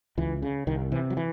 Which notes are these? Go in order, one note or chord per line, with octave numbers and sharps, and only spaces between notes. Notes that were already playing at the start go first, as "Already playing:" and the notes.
C#2 E3
C#3
C2 D#3
C3 E3
F#3
E3